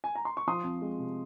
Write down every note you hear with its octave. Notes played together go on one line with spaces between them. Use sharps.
G#5
A#5
C6
C#6
F3 C6 D#6
F2
G#3
C3